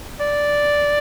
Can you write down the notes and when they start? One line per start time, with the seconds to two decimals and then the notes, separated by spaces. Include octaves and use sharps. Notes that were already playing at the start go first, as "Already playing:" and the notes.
0.20 D5